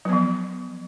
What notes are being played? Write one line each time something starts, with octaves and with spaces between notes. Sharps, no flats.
F3 F#3 B3